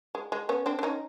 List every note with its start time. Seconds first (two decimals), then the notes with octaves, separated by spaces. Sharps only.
0.15 G#3
0.32 G#3
0.49 B3 C#4
0.66 C4 D4
0.79 D4
0.83 C#4 D#4